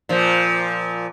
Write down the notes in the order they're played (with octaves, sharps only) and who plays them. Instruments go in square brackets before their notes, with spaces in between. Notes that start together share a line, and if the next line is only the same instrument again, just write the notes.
[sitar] A#2 F3